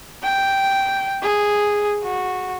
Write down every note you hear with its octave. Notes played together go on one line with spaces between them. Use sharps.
G5
G#4
F#4